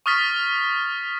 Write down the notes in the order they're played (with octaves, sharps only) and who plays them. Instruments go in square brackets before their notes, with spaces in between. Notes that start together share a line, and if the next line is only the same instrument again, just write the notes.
[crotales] C#6 D#6 F6 A6 B6